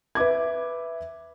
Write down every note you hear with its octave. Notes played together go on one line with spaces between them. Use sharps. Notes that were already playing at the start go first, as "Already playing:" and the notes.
B4 E5 D6 G#6